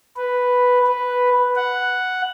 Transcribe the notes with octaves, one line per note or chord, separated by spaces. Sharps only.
B4
B4
F#5